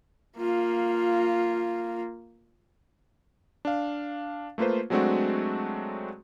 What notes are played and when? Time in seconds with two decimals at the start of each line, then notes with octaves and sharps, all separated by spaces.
0.38 A#3 F4
3.65 D4 F5
4.58 A3 A#3 F4 B4 C5
4.90 F#3 G#3 A3 C4 D4 F#4